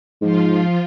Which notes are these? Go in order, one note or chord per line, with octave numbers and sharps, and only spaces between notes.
G#2 F3 F4